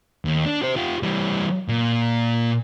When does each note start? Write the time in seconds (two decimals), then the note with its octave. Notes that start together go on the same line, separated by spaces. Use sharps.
0.25 D#2
0.46 D4
0.62 G4 C5
0.76 F4 G4
1.03 E3 G3
1.68 A#2